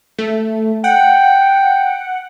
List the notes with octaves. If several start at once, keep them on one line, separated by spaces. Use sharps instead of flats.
A3
F#5 G5